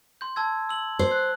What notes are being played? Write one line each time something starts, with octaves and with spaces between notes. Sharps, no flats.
C6 G6
A5 E6 G#6
E6 F#7
C5
F#6